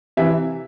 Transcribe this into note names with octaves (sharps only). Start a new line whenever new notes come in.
C3 E3 E5